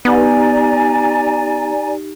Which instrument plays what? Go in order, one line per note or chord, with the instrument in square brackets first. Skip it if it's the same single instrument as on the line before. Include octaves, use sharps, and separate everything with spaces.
[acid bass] B3 [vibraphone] D#4 G4 [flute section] D5 G#5 A#5